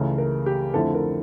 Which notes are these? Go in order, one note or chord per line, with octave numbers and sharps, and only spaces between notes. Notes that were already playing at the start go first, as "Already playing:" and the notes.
Already playing: C#2 C#3 E3 A3
A#4
G4
F2 D3 F3 A3 E4 A4
A#4